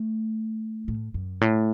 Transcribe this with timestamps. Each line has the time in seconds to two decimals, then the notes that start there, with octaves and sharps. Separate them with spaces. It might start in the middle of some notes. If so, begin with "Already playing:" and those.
Already playing: A3
0.88 A2
1.14 F#2
1.41 A2